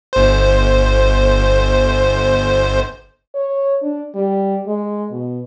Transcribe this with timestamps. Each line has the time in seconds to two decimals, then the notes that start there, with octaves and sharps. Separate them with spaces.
0.13 G1 C5
3.35 C#5
3.82 D4
4.15 G3
4.67 G#3
5.11 B2